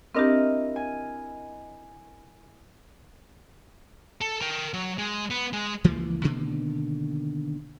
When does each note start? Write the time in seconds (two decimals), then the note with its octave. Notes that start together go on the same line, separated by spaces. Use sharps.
0.15 C4 D4 E4 G4 A#4 D#5
0.76 G#5
4.21 A4
4.41 A#4 G5
4.74 F#3
4.98 G#3
5.30 B3
5.53 G#3
5.84 C#2 E3 F3 A#3
6.23 B2 D3 D#3 A#3